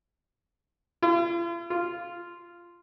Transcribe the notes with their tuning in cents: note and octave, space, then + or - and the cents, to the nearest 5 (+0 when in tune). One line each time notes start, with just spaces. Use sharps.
F4 -45
F4 -10